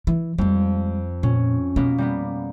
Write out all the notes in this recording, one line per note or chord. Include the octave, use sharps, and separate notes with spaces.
E3
F2 G3 G#3
A#2 C#4
B2 A#3 B3 C#4
G3 A#3 B3